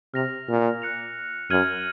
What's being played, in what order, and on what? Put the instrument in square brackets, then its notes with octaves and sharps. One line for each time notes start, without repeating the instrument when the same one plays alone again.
[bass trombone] C3 [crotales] F6 A#6 F7
[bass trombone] A#2
[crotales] F#6 C#7 F7
[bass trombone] F#2 [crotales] F6 G#6 D#7 F#7